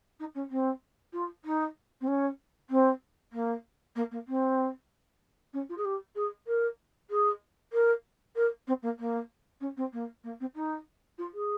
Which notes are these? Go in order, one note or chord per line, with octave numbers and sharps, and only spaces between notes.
D#4
C#4
C4
F4
D#4
C4
C#4
C4
A#3
A#3
A#3
C4
C#4
F4
G#4
G4
G#4
A#4
G#4
A#4
A#4
C4
A#3
A#3
C#4
C4
A#3
A#3
C4
D#4
F4
G#4